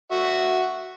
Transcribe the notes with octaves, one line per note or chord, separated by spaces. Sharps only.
F#4 E5